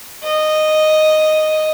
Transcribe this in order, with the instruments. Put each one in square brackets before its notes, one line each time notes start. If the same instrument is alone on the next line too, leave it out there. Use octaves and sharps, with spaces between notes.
[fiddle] D#5